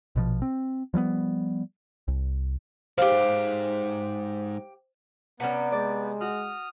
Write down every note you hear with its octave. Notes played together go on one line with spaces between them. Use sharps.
A#1 B2 F3
C4
F3 G3 A3 B3
C2
B1 G#2 G4 C5 F5
C3 G3 B3 C#4 F#5
G#3 D5
F#4 D#6 F6